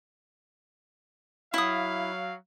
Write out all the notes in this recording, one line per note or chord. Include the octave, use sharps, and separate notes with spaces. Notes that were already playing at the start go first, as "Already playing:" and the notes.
F#3 E4 F5 D#6